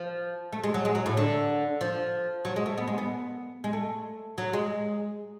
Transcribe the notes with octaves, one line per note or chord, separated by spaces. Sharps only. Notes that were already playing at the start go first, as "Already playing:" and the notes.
Already playing: F3
A3
G#3
F#3
G#3
F#3
A2
D3
F3
F#3
G#3
A3
B3
G#3
B3
G#3
A3
F#3
G#3